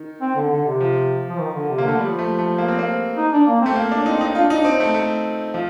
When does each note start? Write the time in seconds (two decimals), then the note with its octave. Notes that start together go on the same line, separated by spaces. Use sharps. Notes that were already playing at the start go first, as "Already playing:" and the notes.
Already playing: D#3
0.21 C4
0.36 D3
0.51 D3
0.66 C3
0.80 F3
1.29 F3
1.40 D#3
1.54 D3
1.69 C3
1.78 A#3
1.84 D3 A3
1.99 F3 G3
2.19 A3
2.39 A3
2.58 A#3
2.68 C4
2.79 A#3
3.17 D#4
3.33 D4
3.47 A#3
3.61 A3 C4
3.76 A#3
3.92 D4
4.06 C4 D#4
4.21 D#4
4.35 D4 F4
4.50 D#4
4.55 D4
4.65 C4
4.80 A3
4.94 A3
5.54 F3